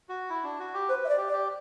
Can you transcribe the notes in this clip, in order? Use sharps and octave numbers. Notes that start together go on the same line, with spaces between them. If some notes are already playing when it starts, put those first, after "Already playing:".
F#4
E4
D4
F#4
G4
B4 C5
E5
D5
G4
D5
G4